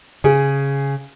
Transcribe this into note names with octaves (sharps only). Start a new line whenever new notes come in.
C#3 G#4